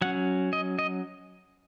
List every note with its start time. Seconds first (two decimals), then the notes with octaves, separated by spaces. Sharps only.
0.02 F#3 C#4 F#5
0.53 D#5
0.79 D#5